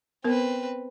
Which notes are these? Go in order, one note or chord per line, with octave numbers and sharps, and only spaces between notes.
B3 C4 A#4 B4